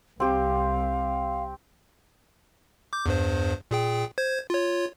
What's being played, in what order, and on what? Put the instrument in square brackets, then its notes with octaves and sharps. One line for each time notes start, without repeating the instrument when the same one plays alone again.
[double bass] C2 [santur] C4 G4 [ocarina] F5
[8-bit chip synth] D6 G6
E2 G2 C5
A#2 G#4 G5
C5 G#6
F4 C#5